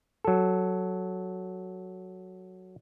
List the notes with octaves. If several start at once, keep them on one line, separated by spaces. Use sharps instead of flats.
F#3 A4